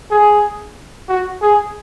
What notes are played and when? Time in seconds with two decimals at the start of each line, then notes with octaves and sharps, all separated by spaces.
0.11 G#4
1.09 F#4
1.42 G#4